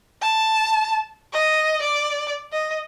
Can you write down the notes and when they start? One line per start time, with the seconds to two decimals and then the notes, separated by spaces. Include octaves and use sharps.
0.22 A5
1.33 D#5
1.82 D5
2.52 D#5